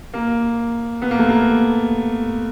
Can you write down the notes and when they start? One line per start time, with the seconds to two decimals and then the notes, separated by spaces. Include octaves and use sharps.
0.14 A#3
1.02 B3
1.11 A#3
1.19 A3
1.29 A#3